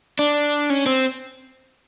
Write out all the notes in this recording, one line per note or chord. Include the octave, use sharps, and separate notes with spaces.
D4
C#4
C4